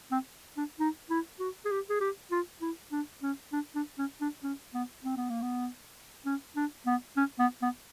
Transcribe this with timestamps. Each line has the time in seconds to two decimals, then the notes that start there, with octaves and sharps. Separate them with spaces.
0.11 C4
0.57 D4
0.79 D#4
1.10 E4
1.40 F#4
1.65 G#4
1.71 G4
1.90 G#4
2.01 G4
2.31 F4
2.61 E4
2.92 D4
3.22 C#4
3.52 D4
3.75 D4
3.98 C#4
4.21 D4
4.43 C#4
4.74 B3
5.04 C4
5.17 B3
5.29 A#3
5.42 B3
6.26 C#4
6.56 D4
6.86 B3
7.17 C#4
7.39 B3
7.62 B3